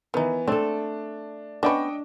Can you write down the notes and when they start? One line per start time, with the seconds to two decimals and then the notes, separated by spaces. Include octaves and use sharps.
0.14 D#3 E3 B3 D#4
0.48 A3 C4 D4 A4
1.63 B3 C#4 D4 B4 D#5 G5 C#6